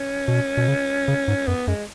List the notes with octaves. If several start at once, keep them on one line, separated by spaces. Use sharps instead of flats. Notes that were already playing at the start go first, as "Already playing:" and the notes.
Already playing: C#4
B2
B2
C#3
C#3
G#2
F#2 B3
F#2 G#3